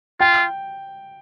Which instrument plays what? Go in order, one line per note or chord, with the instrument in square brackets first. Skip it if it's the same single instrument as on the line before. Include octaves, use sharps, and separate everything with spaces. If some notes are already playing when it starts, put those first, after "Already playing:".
[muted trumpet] F4 [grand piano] G5